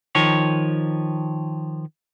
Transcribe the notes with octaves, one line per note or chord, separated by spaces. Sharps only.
D#3 F3 C#5